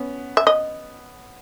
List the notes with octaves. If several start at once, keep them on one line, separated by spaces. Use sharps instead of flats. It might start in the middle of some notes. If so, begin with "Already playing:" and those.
Already playing: B3 C#4
E5
D#5